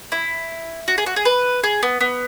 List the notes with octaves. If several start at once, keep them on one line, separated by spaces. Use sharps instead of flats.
E4
F#4
G#4
F#4
G#4
B4
G#4
B3
B3